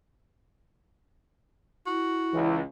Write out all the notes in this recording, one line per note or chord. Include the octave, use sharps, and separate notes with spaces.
E4 F#4
C#2 E3